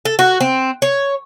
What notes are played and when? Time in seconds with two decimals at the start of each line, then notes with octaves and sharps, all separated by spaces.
0.05 A4
0.19 F#4
0.41 C4
0.82 C#5